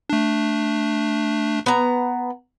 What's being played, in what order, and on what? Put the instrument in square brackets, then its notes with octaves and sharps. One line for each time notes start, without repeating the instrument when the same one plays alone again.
[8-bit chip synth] A3 D4
[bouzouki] B3 A#5